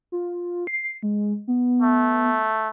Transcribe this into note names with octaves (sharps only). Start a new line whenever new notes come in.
F4
C7
G#3
B3
A3